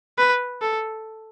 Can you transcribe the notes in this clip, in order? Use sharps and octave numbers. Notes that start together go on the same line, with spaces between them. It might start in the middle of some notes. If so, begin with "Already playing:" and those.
B4
A4